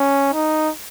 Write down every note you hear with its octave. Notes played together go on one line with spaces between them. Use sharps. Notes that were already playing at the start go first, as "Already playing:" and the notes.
Already playing: C#4
D#4